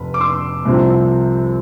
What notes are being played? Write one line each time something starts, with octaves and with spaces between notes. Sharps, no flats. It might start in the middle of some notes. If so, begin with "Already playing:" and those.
Already playing: F1 B4 B5
D6
C6 E6
C2 C3 F3 C4